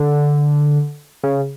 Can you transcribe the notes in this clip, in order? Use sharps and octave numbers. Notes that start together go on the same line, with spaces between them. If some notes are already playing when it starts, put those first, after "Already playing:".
Already playing: D3
C#3